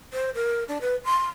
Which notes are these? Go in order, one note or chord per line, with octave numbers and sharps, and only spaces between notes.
C5
A#4
D4
B4
C6